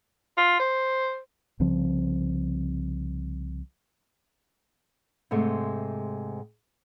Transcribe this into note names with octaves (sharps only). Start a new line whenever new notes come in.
F4
C5
C2 C#3 F3 C4
G#2 C3 G#3 A3